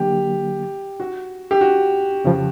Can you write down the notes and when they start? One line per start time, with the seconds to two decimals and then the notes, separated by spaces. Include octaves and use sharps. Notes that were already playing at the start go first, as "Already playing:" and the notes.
Already playing: D3 F#3 A#3 G4
1.00 F#4
1.51 G4
1.61 F#4
2.24 F2 C#3 F3